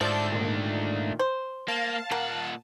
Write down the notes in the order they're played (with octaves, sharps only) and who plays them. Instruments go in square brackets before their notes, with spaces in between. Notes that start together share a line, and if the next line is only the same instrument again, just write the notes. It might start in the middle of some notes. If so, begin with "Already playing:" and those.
[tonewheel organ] G#2 [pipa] F3 [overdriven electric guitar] A3 D4 [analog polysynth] A4 D5 G6
[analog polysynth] A#2 D#3
[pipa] C5
[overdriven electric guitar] A#3 [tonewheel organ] F5 [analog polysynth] A5
[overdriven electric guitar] A#2 F#5 [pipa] A#3